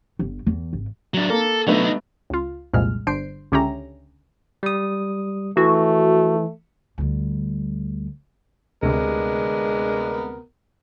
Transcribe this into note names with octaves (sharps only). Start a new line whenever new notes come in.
G1
E2
G#1
F#3 D4
A#3 A4
D3 F#3 A3 B3 D#4
C#2 F4
C2 F2 A#2 G#3 F6
G1 D4 C5 C7 D7
C#2 D3 C#4 G4 E5 A#5
G3 D#6
E3 A3 F#4
D2 G3
D2 C3 G#3 B3 D4 A#4